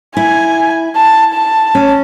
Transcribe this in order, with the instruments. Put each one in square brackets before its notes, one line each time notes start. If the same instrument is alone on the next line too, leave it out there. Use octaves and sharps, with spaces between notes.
[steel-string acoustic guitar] E4 [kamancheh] G#5
[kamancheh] A5
A5
[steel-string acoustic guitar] C#4